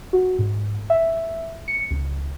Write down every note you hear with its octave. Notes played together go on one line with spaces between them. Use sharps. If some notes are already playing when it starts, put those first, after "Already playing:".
F#4
G#2
E5
C#7
C#2